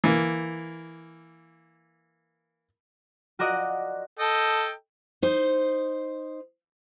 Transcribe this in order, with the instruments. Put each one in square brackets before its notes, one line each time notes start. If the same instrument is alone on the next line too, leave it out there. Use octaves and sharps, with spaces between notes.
[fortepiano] E3 A#3
[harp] F4 F#4 A#4 D5 D#5 F#5
[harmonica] A4 D#5 G5
[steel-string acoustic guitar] D#4 C5